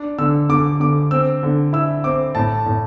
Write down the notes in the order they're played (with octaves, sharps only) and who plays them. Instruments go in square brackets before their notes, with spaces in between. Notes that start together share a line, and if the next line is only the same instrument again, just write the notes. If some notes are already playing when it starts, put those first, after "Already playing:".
Already playing: [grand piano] D4
D3 E6
D3 D6
D3 D6
C4 E6
D3
E4 E6
C4 D6
A2 A5
A2